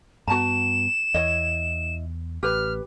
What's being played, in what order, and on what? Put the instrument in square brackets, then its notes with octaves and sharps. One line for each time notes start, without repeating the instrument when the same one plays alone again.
[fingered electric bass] G2 B3 [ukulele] F#4 A5 A#5 [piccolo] E7
[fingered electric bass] E2 [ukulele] E4 C#5 D#5
[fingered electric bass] A1 [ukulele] G4 B4 [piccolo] F6